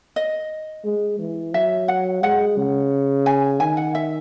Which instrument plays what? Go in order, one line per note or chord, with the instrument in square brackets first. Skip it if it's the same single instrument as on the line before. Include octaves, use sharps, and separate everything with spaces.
[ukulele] D#5
[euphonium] G#3
E3
[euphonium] F#3 [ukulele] E5
[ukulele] F#5
[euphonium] G#3 [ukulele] F#5
[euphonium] C#3
[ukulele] G#5
[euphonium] D#3 [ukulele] G#5
[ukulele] F#5
E5